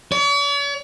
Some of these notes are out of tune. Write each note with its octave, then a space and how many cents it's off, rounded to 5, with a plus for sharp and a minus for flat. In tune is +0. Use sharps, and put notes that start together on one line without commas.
C#5 +45